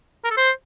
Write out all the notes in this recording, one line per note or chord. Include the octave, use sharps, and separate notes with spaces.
A#4
A4
C5